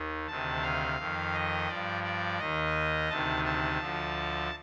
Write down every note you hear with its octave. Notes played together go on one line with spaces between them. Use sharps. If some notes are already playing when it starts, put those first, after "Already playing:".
Already playing: D#2 D#3
D2 C3 D#3 A5
F5
F2 D#3
D#5
G2 F3 D5
D5
D#2 D#3 D#5
D2 C3 D#3 A5
A5
D2 D3 F3